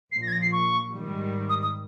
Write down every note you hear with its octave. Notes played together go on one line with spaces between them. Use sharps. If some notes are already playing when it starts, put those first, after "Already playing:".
A#1 A#2 F3 C7
A#6
G#6
A#6
C7
C#6
G#2 D#3 G3
D#6
D#6